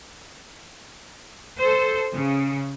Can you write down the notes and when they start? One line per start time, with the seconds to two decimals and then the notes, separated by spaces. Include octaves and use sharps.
1.58 A4 C5
2.12 C#3